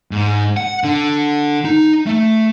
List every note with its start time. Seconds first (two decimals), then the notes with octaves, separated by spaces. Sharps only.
0.11 G#2
0.57 F#5
0.84 D3
1.65 D#4
2.06 A3